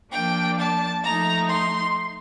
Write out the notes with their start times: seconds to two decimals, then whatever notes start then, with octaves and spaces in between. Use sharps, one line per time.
0.12 F3 A#3 D4 G5
0.58 A5
1.02 F3 A3 D#4 A#5
1.48 C6